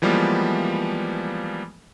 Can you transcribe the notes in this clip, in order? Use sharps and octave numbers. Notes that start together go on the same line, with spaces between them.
E3 F3 G3 G#3 A#3 B3